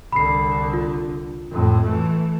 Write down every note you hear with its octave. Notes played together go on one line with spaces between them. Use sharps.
C2 D3 B5 C7
F4
F2 A2
E3 A3